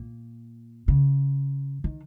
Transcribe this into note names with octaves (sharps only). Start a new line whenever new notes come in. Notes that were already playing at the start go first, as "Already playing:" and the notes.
Already playing: A#2
C#3
D#3